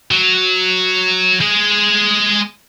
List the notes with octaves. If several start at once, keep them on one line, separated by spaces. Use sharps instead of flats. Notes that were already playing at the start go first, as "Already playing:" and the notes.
F#3
G#3 G#4